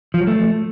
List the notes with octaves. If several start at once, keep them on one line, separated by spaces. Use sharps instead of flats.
F3
F#3
A3